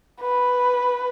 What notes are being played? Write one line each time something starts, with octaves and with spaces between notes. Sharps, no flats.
B4